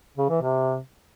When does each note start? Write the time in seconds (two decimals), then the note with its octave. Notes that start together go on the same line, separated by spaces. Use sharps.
0.18 C#3
0.30 E3
0.42 C3